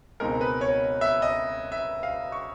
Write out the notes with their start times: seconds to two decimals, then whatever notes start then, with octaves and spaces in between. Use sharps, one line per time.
0.20 C#2 B2 G#3 C4 D#4 A#4
0.41 B4
0.61 C#5
1.01 E5
1.22 D#5
1.72 E5
2.03 F5
2.32 C#6